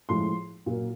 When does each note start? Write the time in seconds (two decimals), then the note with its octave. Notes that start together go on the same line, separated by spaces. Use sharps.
0.09 A2 F3 G#3 C6
0.66 A#2 F#3 A#3